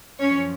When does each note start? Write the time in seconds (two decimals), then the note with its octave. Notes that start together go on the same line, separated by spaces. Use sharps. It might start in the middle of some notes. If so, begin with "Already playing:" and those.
0.19 F#2 F3 C#4 C#5